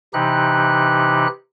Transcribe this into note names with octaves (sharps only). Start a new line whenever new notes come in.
C3 E3 D#4 G4 F#6